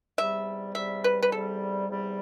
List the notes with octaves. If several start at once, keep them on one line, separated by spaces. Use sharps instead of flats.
E2 C3 G3 E5
E2 C3 G3 E5
B4
B4
E2 C3 G3 A4
E2 C3 G3